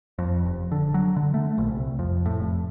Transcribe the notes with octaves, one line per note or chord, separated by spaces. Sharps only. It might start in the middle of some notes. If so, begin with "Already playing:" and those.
F2
F1
D3
F#3
D3
A3
A#1
C2
F2
A2
F1